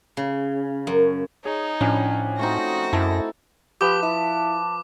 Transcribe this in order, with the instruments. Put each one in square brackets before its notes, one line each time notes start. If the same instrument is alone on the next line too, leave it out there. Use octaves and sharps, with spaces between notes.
[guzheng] C#3
F#2
[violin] D#4 [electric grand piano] G#4 C#5
[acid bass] A2 [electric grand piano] F3 C#4 D4 [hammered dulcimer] G#5
[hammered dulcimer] A3 C4 D#4 [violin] F#4 A#6
[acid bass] F#2 [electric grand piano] E4 [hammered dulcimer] A4
[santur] F3 B4 B5 [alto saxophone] G4 [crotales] D6
[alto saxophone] E4 [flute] A5